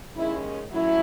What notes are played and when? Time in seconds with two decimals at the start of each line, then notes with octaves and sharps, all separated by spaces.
0.14 D#2 D#3 G#3 C#4 E4
0.70 A2 F#3 A3 C#4 E4